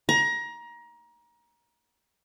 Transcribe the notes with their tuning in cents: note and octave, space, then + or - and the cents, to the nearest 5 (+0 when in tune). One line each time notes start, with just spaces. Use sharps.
A#5 +25